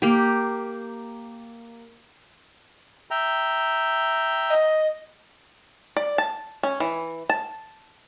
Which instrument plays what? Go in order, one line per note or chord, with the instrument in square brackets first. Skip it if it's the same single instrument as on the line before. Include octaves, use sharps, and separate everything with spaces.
[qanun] A#3 G4
[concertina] E5 G5 A#5
[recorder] D#5
[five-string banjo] D5
A5
C#4
E3
A5